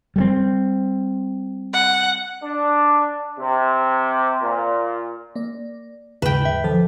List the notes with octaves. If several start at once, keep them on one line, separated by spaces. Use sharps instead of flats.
G3 G#3 C4
F#5
D4
C3
A#2
A#3 D5
D#2 G#2 C#3 B4 G5
E5
D3 F3 A4